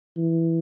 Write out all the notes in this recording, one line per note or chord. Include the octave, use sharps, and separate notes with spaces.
E3